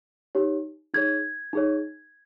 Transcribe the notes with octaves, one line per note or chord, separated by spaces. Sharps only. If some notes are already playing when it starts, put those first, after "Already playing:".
D#4 G4 C#5
D#4 G#4 C#5 G#6
D#4 G#4 C#5